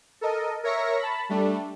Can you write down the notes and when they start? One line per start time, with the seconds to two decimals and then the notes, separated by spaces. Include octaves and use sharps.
0.21 A4 A#4 D#5
0.63 A#4 C#5 E5 A#6 C#7
1.00 A5 B5
1.29 G3 A3 D4